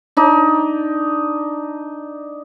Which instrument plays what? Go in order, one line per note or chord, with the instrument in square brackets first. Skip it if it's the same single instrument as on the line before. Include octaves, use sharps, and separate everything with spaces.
[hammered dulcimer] D4 D#4